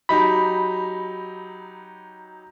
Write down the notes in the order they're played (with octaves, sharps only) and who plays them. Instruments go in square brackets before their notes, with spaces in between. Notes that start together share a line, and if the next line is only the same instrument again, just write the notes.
[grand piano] F#3 D#4 G4 [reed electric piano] B5